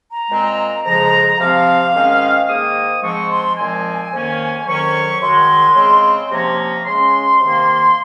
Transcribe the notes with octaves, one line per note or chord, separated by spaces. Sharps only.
A#5
A#2 G#3 C4
F2 C#3 F3 G#3 A#5
C3 F3 C4 F5
G#2 D#3 G#3 C#4
G#2 D#3 A#3 D#6
G#2 F3 G#3 C4 C#6
C6
A#2 F3 G#3 C4 G#5
F2 D#3 A#3 C#4
F2 D#3 F#3 C#4 C#6
F#2 D#3 G#3 C6
C#3 G#3 C4
C3 F3 A#3 C#4 A#5
C#3 G#3 C#4 C6
C3 D#3 A#3